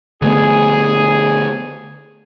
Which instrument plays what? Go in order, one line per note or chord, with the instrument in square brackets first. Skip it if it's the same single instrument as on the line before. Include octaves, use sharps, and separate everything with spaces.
[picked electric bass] D3 A3 B3 [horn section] G#4